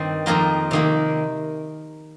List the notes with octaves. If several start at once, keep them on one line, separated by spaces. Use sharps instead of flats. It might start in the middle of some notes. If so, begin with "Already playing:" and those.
Already playing: G2 D#3 G3 C4
F2 D#3 A#3 F4 A#4
C3 D#3 A#3